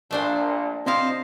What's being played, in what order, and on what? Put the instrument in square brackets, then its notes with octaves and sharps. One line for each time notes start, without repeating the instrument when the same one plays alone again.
[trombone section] A#1 A#2 [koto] A3 D4 C5
[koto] C3 E4 F5 [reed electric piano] C4 [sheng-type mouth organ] F4 C5 D#5